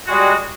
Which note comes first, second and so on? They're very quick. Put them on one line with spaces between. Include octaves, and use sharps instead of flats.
F#4 G#3 G3